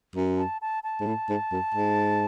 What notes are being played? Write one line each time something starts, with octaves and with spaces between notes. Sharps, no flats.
F#2
A5
A5
A5
G#2
A2
G#2
F#2
G#2